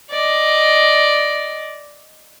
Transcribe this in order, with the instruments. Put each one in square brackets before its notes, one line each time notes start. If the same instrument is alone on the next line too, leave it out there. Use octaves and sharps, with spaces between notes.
[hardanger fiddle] D5 D#5